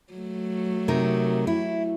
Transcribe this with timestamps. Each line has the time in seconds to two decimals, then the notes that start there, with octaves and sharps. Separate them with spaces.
0.13 F#3 A3
0.88 C3 D#4 A#4
1.47 E4